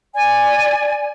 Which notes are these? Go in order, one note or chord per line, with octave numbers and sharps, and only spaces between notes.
D5 G#5